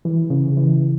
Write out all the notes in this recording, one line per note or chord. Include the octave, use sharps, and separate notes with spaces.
E3
C#3
E3